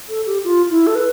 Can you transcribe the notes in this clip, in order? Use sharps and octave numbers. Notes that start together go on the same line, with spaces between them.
A4
G4
F4
E4
A4
B4